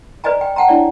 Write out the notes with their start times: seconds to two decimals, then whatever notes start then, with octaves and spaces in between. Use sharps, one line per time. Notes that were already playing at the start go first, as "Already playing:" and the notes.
0.24 B4 D5 D#5 G#5 A#5
0.41 G5
0.56 F#5 G5 A5 A#5
0.68 D4 E4 C#5 D5